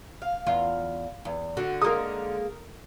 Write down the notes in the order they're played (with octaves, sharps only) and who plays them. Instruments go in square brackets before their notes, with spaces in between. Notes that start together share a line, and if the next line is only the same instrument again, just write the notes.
[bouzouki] F5
[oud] E2 F4
E2
[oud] D3 [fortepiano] F#4
[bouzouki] G#3 A#3 [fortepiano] A#4 D#6